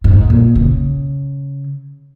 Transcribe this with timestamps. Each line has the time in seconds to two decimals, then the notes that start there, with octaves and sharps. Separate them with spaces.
0.04 G#2
0.30 A#2
0.55 C#3